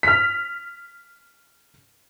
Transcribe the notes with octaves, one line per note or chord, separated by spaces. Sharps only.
F6 B6